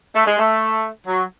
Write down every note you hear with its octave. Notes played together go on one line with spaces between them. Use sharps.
A3
G#3
A3
F#3